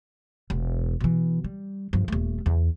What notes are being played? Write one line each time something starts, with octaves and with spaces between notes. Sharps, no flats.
E1
B2 E3
G3
G2 F3
D#1 A3
E2